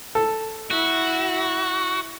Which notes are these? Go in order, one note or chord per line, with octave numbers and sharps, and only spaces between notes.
A4
E4 F#4